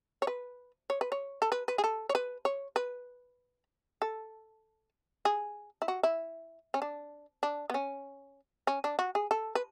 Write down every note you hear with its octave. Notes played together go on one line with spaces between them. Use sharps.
C#5
B4
C#5
B4
C#5
A4
B4
B4
G#4
A4
C#5
B4
C#5
B4
A4
G#4
E4
F#4
E4
C#4
D4
D4
B3
C#4
C#4
D4
F#4
G#4
A4
B4